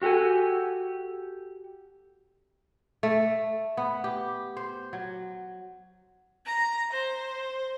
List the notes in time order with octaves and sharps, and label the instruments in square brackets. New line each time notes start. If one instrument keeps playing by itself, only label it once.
[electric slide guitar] F#4 G4 A4 F#5 G#5
[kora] A3
B3
G4
C5
F#3
[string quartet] A#5
C5